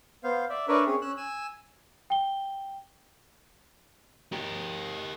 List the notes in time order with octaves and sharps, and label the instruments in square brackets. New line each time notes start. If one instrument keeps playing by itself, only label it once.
[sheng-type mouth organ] B3 C5 F5
D5 E5
D4 A#4 B4 C#5 D5 E5
C4 C#4 G#4 C#5
C#4 E6 F#6
G#5 E6
[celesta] G5 G7
[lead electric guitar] G4 A#4